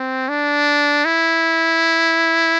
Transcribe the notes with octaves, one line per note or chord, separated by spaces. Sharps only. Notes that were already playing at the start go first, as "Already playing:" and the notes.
Already playing: C4
D4
E4